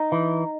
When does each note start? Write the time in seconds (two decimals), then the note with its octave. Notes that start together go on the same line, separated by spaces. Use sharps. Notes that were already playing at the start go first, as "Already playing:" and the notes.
Already playing: D#4
0.12 E3